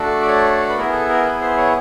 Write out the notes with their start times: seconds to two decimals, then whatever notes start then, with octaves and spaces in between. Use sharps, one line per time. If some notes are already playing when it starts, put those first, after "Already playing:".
Already playing: A3 D4 F#4 A4
0.21 D5
0.28 C#5
0.69 B4
0.77 B3 E4 G#4 A#4
0.93 A4
1.09 A#4
1.25 B4
1.41 C5
1.57 C#5